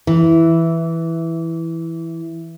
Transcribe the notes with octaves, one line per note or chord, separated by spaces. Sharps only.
E3